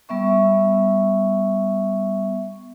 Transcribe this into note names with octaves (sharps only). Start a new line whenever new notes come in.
G3 B3 E5 C#6